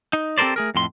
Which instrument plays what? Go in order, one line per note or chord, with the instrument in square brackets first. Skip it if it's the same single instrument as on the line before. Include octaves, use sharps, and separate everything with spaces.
[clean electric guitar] D#4
C4 G4 A4 A#4 C5 D5
A3 G#4 A#4
F2 A2 C6